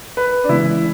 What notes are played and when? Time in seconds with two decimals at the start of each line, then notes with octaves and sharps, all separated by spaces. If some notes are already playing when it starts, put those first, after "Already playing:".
0.17 B4
0.44 D4
0.49 C#3 E3 G#3 B3 E4